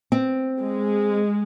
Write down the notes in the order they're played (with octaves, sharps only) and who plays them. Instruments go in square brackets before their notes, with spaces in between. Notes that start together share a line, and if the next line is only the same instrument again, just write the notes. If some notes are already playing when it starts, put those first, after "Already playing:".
[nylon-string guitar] C4
[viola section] G#3